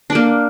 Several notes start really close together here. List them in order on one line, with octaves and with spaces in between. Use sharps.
D4 D5 A#3